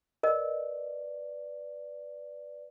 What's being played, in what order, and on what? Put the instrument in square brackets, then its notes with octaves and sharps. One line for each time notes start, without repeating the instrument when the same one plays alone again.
[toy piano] A#4 D#5 [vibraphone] B4 D5